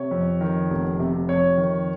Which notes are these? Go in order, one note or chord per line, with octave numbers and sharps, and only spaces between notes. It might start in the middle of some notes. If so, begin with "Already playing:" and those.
Already playing: C3 C#5
F2
D#3
F1
C3
F2 C#5
D#3